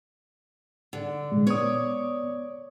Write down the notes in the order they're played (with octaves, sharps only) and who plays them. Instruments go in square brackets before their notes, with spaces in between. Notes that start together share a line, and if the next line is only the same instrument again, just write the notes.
[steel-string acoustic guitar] D3
[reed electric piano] A#2 G#3
[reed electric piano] B3 D#6 [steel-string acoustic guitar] C#5 D5